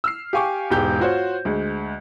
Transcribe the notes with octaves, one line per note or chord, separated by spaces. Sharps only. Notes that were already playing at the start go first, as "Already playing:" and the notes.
E6 F6 C7
G4 F5 G#5 C#6 D6
E1 G#2 G4 G6
F4 F#4 C5 C#5
D2 G#3